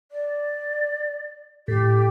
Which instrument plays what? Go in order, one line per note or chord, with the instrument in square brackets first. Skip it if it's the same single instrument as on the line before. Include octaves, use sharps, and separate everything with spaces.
[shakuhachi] D5
[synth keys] A2 [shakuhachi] G4